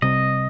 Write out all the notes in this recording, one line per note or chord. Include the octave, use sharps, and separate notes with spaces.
C3 G3 C4 D#5